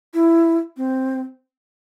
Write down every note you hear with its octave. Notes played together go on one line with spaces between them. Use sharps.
E4
C4